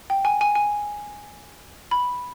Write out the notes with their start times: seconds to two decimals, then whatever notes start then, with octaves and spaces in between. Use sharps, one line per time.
0.10 G5
0.25 G#5
0.41 G#5
0.55 G#5
1.91 B5